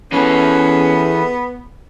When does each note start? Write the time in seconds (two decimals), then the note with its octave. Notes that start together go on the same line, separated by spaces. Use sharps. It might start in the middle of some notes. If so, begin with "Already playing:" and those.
0.12 E2 E3 B3 C#4 G#4 A4